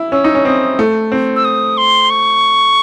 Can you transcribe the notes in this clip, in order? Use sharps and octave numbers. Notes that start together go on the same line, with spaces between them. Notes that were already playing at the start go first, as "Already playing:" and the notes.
Already playing: E4
C#4 E6
D#4
C#4
C4 D#6
A3
C4
E6
D#6
C6
C#6